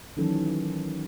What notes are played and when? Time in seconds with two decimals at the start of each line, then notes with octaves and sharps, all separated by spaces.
0.17 D#3 E3 F#3 C#4 A4